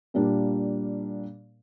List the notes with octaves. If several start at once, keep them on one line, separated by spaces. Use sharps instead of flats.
A#2 G3 A#3 D4 A#4